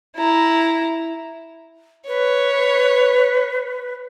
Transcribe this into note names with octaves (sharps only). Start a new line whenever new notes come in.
E4 A#5
B4 C#5